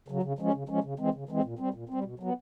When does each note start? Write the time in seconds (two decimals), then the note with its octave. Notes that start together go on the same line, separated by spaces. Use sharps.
0.08 C#3 F#3
0.23 C#3
0.39 F3 G#3 C#4
0.53 C#3
0.69 F3 G#3 C#4
0.84 C#3
0.99 E3 G#3 C4
1.14 C#3
1.29 E3 G#3 C4
1.44 A#2
1.59 G3 C4
1.74 A#2
1.89 G3 C4
2.04 B2
2.20 F#3 B3